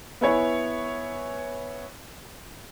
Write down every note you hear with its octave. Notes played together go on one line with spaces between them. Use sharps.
B3 E4 C#5 G#5